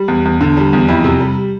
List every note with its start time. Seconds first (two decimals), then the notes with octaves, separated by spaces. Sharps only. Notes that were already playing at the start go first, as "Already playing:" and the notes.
Already playing: G3
0.08 E2
0.25 E2
0.41 D3
0.57 G3
0.73 E2
0.88 F2 E4
1.04 C3
1.20 G3